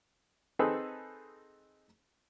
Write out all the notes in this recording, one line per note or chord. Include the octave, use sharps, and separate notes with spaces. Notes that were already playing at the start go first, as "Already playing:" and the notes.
C4 D#4 G#4 A4 B4